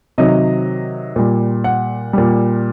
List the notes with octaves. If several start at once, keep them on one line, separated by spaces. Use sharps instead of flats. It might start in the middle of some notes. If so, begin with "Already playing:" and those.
C3 D#3 F#3 D#5
A#2 G3
F#5
A#2 G3